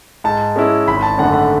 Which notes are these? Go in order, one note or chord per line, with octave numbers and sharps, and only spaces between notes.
G#2 A5
G#3 C#4 E4
G#1 B5
A5
F#2 D3 A3 F#5
F#5